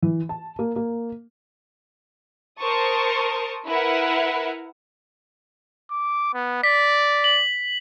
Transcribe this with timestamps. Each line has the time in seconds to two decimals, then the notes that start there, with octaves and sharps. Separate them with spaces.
0.02 E3
0.29 A5
0.59 A#3
0.76 A#3
2.59 A#4 C5 A5 C#6 D#6
3.66 E4 A#4 B4 E5 F#5
5.90 D6
6.34 B3
6.64 D5 B6
7.24 F#7